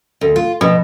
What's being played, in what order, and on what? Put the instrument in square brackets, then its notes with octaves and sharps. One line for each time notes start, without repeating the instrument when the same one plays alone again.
[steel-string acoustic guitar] D2
F4
[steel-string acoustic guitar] B2 [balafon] F3